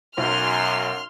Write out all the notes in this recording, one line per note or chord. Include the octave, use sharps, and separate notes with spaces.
B1 F#2 C6 F6